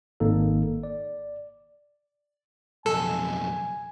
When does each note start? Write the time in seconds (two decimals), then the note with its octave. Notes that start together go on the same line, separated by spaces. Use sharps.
0.20 G#1 A#3 D#4 A4
0.83 D5
2.86 B1 F2 A4 G#5